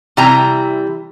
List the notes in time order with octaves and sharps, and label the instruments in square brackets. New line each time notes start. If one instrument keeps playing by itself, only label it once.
[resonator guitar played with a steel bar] C3 E3 G3 A#5